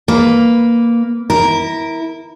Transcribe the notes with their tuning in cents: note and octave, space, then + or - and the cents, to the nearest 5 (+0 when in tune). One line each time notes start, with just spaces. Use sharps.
A#3 +0 B4 +0
E4 -20 A#4 +0